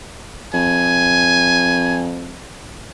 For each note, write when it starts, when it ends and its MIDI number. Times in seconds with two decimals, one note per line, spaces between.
0.54 2.40 41
0.54 2.05 80